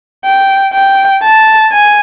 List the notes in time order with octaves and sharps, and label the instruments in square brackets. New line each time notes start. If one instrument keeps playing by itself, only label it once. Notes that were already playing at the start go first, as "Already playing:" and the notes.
[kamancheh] G5
G5
A5
G#5